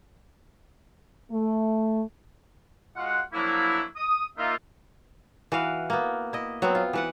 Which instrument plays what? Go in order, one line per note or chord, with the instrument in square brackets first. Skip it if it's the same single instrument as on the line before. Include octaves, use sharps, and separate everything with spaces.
[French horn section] A3
[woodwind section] G#3 F4 F#4 F5 F#5
F3 F#3 A#3 D4 E4
D#6
A#3 D#4 F4 E5
[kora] E3 F#4 B4 F5
A#3 B3
E4 D#5
F#3 B3 C4
F4
E3 B4 F#5